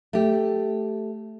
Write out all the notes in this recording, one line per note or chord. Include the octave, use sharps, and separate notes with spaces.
A3 G4